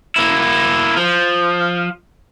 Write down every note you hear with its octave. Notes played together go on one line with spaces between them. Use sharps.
A#3 E4
F3